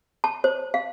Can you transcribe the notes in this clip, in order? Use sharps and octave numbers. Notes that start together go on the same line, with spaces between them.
A5
C5
F5